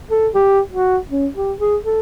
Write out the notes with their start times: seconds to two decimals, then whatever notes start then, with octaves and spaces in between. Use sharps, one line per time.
0.11 A4
0.34 G4
0.72 F#4
1.10 C#4
1.35 G4
1.59 G#4
1.85 A4